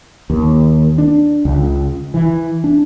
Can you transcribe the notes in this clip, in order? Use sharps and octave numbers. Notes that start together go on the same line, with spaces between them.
D#2
D4
C#2
E3
D4